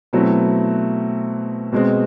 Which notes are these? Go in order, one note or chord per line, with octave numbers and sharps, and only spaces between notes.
B2 F#3 A3 C4 E4
B2 G#3 C4